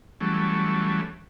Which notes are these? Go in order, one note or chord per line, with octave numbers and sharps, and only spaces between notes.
E3 F#3 G3 A3 C#4